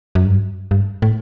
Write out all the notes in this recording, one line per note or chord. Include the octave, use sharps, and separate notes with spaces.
F#2
G2
G2
A2